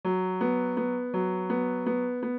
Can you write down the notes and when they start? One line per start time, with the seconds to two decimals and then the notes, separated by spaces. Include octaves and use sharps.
0.05 F#3
0.41 B3
0.77 B3
1.14 F#3
1.50 B3
1.86 B3
2.23 B3